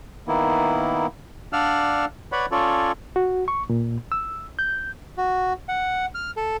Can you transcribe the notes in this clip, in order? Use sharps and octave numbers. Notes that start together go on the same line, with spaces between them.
D#3 A#3 B3 E4
D4 D5 F5 F#5 E6 F6
B4 C#5 D5 F#5 B5
C#4 F4 A4 C#5 D5
F#4
C#6
A#2
E6
G6
F#4
F#5
F6
A4